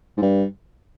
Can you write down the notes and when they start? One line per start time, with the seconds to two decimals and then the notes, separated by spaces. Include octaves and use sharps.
0.17 G#2
0.22 G2